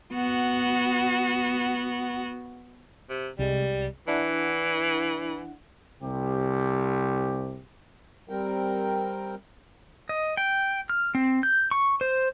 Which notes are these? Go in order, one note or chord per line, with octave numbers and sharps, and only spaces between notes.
B3 F#4
C3
C2 G3 G#3
E3 D4 E4 F#5
C2 C3 G4
G3 C4 A#4 G5
D#5
G5
F6
C4
G6
C#6
C5